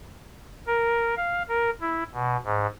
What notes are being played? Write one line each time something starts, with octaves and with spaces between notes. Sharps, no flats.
A#4
F5
A#4
E4
B2
G#2